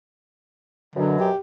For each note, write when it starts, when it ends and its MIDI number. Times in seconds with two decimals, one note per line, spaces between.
0.96 1.29 42
0.96 1.29 47
0.96 1.18 50
0.96 1.29 54
1.20 1.38 67